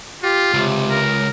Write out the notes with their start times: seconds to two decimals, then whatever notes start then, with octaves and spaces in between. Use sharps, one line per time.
0.23 F4 G4
0.54 C#2 C3
0.90 A#4